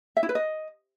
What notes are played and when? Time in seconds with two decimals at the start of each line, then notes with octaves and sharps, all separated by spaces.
0.17 E5
0.23 E4
0.29 B4
0.35 D#5